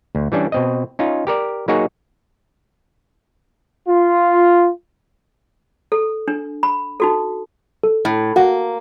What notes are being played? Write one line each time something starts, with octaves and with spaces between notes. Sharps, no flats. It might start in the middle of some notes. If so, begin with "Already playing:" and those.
D2
E3 G3 C#4 D4
B2 C4 D#5
C#4 D#4 F4
G4 A#4 D5
F#3 A#3 D#4 F#4 G#4 C#5
F4
A4
D4
B5
D#4 F#4 A4
A4
A2
A#3 F#4 F#5